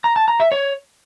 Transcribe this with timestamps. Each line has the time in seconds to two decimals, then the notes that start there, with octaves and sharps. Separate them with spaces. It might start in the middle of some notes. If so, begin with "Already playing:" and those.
0.04 A#5
0.16 A5
0.28 A#5
0.40 E5
0.52 C#5